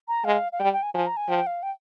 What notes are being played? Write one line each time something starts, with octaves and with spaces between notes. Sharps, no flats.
A#5
G#3 F5
F5
G3 G5
G5
G#5
F3 G#5
A#5
G#5
F3 G5
F5
G5